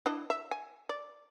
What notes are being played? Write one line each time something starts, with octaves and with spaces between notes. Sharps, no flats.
D4 E4 D#5
E5
G#5
D5